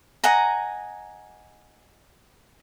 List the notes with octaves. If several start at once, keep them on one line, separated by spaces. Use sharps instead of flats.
D#5 F#5 G#5 A#5